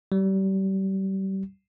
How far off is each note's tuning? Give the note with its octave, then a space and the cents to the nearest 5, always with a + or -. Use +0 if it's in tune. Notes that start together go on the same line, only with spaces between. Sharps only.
G3 -30